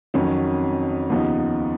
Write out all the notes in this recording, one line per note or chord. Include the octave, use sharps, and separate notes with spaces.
F2 D#3 F#3 C#4
D#2 C#3 F3 B3 D#4